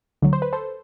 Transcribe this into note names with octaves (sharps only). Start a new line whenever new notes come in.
D2 D3 F#3
C5
B4
A4 C5